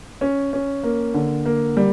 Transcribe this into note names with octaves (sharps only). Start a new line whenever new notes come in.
C#4
C#4
A#3
D3
A#3
G3